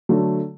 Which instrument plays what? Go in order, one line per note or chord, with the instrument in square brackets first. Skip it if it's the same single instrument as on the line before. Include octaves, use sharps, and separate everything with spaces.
[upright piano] D3 F#3 A3